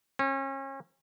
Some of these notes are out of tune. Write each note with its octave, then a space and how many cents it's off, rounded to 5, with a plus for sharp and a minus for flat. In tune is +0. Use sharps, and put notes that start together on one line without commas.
C#4 -35